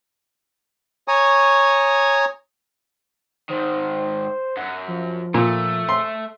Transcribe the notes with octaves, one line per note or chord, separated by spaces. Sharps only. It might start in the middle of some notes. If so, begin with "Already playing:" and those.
C#5 G#5 A#5 C#6 D#6
G#2 D#3 C5
F#2 F#5
F3
A#2 A3
C6